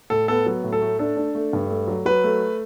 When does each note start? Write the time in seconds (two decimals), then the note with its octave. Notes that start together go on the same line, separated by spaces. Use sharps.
0.10 A2 A4
0.28 B3 A4
0.46 F#3
0.64 A2
0.73 A4
0.82 A3
0.99 D4 A4
1.17 D4
1.35 A3
1.53 G2
1.70 A3
1.87 F#3
2.05 F#3 B4
2.24 A3